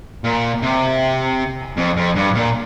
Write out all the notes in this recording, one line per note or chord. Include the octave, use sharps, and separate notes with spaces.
A#2
C3
F2
F2
G2
A#2